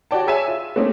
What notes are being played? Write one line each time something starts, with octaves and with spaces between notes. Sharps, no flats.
F#4 G4 C#5 D5 G5 A5
G#4 C#5 E5 G#5 D#7 E7
F4
A3 A#3 C4 C#4 D#4 G4